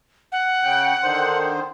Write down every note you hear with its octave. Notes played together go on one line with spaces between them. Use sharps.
F#5
C#3 G5
D3 D#3 C5